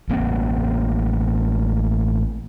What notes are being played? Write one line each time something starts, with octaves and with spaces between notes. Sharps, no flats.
A1 A#3 C4